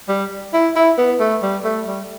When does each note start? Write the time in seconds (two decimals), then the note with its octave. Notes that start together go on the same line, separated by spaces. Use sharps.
0.09 G3
0.54 E4
0.76 E4
0.98 B3
1.20 A3
1.42 G3
1.64 A3
1.87 G3